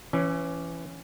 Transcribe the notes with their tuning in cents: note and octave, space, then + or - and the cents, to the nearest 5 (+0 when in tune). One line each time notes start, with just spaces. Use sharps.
E3 +25 C#4 +0